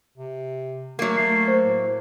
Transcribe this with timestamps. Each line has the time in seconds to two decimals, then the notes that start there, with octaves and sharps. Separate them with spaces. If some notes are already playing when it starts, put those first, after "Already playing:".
0.17 C3
0.99 F#3 A3 A#3
1.17 A3 C7
1.48 C5
1.63 A2